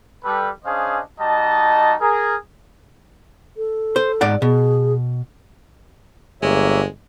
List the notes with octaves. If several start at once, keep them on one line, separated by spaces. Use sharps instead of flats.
G3 A4 B4
C#4 D4 G#4 C5 D#5 F5
G3 D#4 F#4 D#5 A5
G#4 A#4
A4
C5
G#2 D5 F#5
B2 G#4
G1 G#3 A#3 C#5 E5